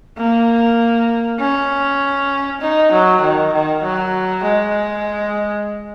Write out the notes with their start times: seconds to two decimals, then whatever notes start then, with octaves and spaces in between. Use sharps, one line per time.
0.18 A#3
1.40 C#4
2.61 D#4
2.92 F#3
3.22 D#3
3.53 D#3
3.83 F#3
4.44 G#3